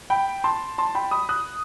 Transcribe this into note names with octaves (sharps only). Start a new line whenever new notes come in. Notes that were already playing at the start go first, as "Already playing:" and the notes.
G5 B5
A5 C6
A5 C6
G5 B5
B5 D#6
D#6 F#6